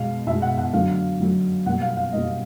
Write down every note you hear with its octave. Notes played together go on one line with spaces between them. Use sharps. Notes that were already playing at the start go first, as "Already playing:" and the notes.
Already playing: B2 G#3 F5
B2 G#3 E5
F#5
F#5
D3 F#3 A3 F5
D3 F#3 A3
B2 G3 A#3 F#5
F5
F5
B2 G3 A#3 D#5